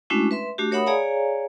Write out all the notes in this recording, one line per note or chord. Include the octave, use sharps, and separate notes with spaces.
G#3 A3 C#4 D4 E4 F#4
B4 E5 C6
A3 D4 F#4 G4
A#4 C#5 E5 F#5 B5 D#6
G#4 C#5 D5 F5 G#5 A#5